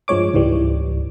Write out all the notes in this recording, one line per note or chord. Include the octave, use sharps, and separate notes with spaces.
G2 F3 G#3 C#5 D6
C#2 G#2 E3 G3